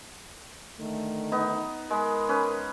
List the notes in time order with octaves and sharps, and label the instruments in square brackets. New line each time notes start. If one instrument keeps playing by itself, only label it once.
[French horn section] D3 D#3 A3
[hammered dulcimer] B3 D#4
[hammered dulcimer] G#3 B5 [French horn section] A#4
[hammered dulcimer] C#4 B4